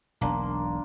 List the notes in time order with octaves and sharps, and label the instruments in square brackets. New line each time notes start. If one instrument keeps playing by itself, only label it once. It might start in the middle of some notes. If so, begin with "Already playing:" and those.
[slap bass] E1 B1 [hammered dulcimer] A#3 D4 C6